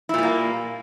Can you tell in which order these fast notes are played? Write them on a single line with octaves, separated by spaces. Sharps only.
E4 A#2 G3 A#3